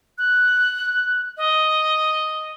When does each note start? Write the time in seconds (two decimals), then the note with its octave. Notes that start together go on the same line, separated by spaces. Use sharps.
0.18 F#6
1.37 D#5